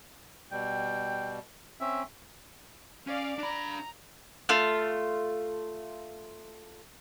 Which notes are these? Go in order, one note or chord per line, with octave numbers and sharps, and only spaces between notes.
B2 G3 G5
C4 C#4 E5
C#4 D5 F5
D4 A#5 B5
A3 F4